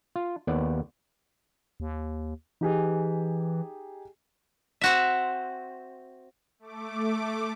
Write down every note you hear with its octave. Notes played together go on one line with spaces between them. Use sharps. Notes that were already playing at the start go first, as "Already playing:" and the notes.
F4
D#2 B3 D5 F#5
D#2
E3 D#4 G4 G#4
C4 F#4 E5
A3 D6